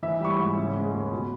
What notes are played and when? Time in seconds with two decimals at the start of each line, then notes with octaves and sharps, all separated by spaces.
0.03 E3 E5
0.21 G3 C#6
0.30 B5
0.39 G#2
0.57 C#3
0.75 G#3
0.94 D#2
1.12 B2